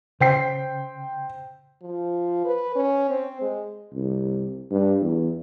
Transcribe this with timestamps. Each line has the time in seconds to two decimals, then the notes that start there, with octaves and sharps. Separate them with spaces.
0.20 C#3 C5 G5 C7
1.82 F3
2.45 B4
2.76 C#4
3.10 C4
3.41 G#3
3.94 C2
4.71 G2
5.01 E2